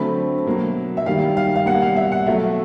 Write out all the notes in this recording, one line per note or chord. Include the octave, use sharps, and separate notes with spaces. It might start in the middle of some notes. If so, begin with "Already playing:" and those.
Already playing: D3 F#3 A3 C4 B5
B2 F#3 A#3
E5
D#3 G3 A#3 F5
F5
F5
B2 G3 A#3 F#5
F5
E5
F#5
B2 F#3 A3 E5